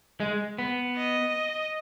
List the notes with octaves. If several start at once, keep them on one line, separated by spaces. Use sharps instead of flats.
G#3
B3
D#5